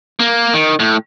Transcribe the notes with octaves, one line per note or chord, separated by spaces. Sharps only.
A#3
D#3
A2